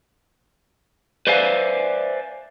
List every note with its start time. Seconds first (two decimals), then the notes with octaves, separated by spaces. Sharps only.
1.27 B4 C5 D5 E5 F5 G#5